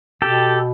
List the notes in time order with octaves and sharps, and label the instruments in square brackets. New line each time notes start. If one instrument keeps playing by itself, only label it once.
[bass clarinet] B2 [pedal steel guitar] G4 A4